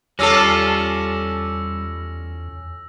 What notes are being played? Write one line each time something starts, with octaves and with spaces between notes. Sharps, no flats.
E2 G3 C#4 F4 A4 D6 E6 A#6